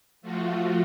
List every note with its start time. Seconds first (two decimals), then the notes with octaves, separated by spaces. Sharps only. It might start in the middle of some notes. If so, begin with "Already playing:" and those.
0.22 F3 A3 F4 F#4